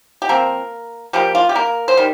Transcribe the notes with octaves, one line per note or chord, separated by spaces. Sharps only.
G4
F3 A#3 C4 A#4
F3 G3 A#3 G4
F4
G4
A#3 A#4
C5
D#3 G3